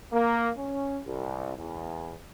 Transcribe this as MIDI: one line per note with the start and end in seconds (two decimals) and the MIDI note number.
0.12 0.51 58
0.58 0.99 61
1.06 1.53 36
1.58 2.16 40